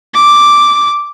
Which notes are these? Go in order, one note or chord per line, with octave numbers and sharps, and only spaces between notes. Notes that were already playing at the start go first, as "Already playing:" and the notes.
D6